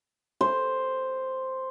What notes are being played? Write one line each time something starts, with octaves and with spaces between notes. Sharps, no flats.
C5